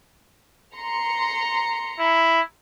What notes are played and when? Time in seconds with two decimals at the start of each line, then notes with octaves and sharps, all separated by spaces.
0.75 A#5 C6 C#7
1.99 E4